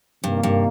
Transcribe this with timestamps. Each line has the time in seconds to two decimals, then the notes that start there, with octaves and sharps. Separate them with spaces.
0.24 G2 C3 D#3 A#3
0.43 G2